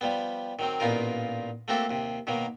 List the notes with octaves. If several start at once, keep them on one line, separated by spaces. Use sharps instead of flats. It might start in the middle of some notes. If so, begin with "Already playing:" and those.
F3 G3 B3
D#3 F#3 C4
A1 A#2 B3 D#4 F4 A#4
A3 A#3 C4 F#4 G4 A4
D#2 C3
B2 D#3 F#3 A#3